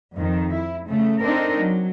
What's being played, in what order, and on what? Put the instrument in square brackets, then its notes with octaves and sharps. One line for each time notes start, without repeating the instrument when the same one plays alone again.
[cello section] F2 D#3
E4
C#3 A3
A3 C4 D4 D#4 A#4
F#3